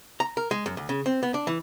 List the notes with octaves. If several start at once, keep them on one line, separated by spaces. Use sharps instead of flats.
A#5
A#4
G#3
F#2
D2
C#3
C4
B3
D4
E3